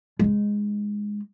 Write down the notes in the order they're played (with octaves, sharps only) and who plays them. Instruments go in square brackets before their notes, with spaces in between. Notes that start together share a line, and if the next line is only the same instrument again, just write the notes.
[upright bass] G#3 D#4